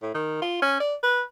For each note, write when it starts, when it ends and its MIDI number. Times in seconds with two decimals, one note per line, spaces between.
0.02 0.13 45
0.15 0.40 51
0.42 0.61 65
0.62 0.78 61
0.80 0.95 74
1.03 1.22 71